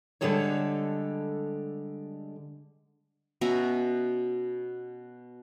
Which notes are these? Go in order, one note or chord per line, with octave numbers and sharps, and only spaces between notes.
D3 G3 G#3 F#4 A4 C#5
B2 C#4 E5 A#5